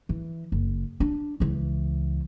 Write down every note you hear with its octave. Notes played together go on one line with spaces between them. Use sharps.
E3
F#1
D4
C#2 E3